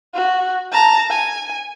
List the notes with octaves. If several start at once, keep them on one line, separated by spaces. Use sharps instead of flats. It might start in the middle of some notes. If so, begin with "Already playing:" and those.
F#4
A5 A#5
G#5